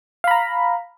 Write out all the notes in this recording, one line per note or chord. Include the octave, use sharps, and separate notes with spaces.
F5 A#5 B5